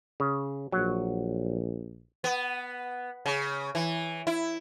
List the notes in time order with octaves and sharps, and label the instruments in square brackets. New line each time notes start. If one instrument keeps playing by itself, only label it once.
[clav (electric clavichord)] C#3
[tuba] A#1 [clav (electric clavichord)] F#3
[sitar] B3
C#3
E3
E4